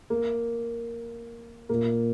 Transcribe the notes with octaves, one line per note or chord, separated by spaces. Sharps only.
A#3
A#2 A#3